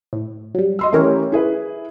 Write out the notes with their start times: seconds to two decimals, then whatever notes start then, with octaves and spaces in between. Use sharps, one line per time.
0.13 A2
0.55 F#3 G3
0.79 D#5 C6 E6
0.93 E3 A3 C#4 G4 A#4 C#5
1.32 E4 G#4 B4